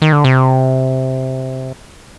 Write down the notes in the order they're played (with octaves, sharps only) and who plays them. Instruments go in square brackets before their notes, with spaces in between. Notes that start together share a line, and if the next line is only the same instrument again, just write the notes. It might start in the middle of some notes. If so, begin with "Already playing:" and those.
[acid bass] D#3
D3
C3